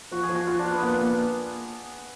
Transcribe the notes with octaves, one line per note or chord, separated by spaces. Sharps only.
F3 F#4
G#4
F3
F#4
F3 F4
D4
F3
B3
A#3 B3
A#3